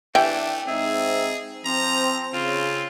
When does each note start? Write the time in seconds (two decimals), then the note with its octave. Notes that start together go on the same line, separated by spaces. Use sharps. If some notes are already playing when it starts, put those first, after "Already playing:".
0.15 E3 A3 D4 G4
0.68 G#2 C4 D#4 G#4 E5
1.65 F3 C4 A#5
2.33 C#3 C4 F4